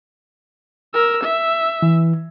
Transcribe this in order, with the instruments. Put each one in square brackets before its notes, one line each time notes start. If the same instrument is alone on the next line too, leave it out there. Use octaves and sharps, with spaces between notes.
[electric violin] A#4 E6
E5
[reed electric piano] E3